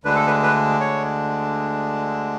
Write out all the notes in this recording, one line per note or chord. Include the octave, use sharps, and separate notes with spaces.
D2 D3 G#3 D4 B4
A4
B4
B4
C#5